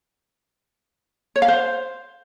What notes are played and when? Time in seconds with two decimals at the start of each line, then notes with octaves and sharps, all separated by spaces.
1.36 C#5
1.42 F5
1.48 C5